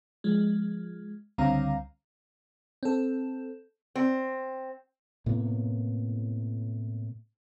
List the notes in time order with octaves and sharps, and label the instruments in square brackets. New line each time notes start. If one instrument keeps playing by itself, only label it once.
[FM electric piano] F3 G#3
C#2 D3 G3 C4 F5 A#5
C4 A4
[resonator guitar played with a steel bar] C4
[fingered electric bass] A2 C3 A#3 B3